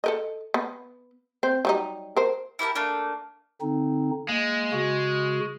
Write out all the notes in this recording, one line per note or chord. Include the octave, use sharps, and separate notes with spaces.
A4 A#4 D#5
B3
C4 C5
F#3 G3 D#4
A#4 C5
E4 G4 A#4 A5
A3 A#3 D4
D3 C4 D#4
G#3 A#3
C#3 F#4